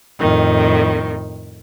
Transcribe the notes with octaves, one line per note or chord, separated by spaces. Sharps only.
F2 A2 D#3